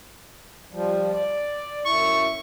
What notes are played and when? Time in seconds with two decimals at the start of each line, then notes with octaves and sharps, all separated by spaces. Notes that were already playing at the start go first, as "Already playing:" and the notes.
0.72 F3 G3
1.12 D5
1.86 F#2 E4 C#6